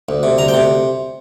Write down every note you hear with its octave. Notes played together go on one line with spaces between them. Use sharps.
D2
C3
D2 A#5
G5
C3